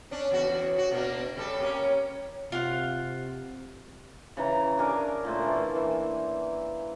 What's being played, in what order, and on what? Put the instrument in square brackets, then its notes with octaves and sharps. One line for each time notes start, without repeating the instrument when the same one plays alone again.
[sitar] C#4 D4
E2 C#3 F#4
F#4
B2 A#3 D4
C#3 G3 A4
A#3 C#4 G4
[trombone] C3 [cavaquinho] F4 F5 F#5
[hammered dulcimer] C#3 E3 A#5
D4 G#4 A#4 D5
A#2 A3 C5
E3 A#3
E3